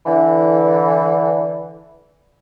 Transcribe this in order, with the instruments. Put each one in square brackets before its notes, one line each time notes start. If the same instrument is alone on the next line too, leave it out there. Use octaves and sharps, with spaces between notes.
[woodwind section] D3 E3